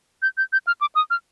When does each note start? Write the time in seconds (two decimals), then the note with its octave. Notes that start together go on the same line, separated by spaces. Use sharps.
0.22 G6
0.37 G6
0.53 G6
0.67 F6
0.81 D6
0.95 D#6
1.10 F6